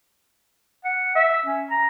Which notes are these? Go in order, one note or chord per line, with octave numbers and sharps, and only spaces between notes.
F#5
E5
C#4
A#5